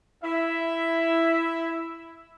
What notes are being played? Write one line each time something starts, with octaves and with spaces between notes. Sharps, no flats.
E4 E5